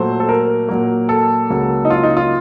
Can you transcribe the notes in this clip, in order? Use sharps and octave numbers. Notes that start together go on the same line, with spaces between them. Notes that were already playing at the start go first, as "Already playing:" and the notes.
Already playing: A#2 F#3 A3 C5
A4
A#4
A#2 F#3 A#3
A4
C#2 C#3 F#3 A#3
D#4
F4
D#4
F4